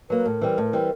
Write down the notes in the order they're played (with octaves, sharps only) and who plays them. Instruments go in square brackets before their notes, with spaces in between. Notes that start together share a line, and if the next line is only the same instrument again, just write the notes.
[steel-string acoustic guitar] F#3 A#3 [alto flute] B4
[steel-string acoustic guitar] A2 [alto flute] A#4
[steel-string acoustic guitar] E3 G3 C4
A2
E3 G3 C4